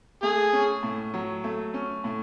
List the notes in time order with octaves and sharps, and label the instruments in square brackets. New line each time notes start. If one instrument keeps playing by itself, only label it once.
[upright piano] A3 [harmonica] G#4
[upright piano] C#4
A2
F#3
A3
C#4
A2